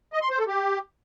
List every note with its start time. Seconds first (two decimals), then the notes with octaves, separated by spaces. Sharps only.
0.13 D#5
0.22 C6
0.30 C5
0.39 A4
0.48 G4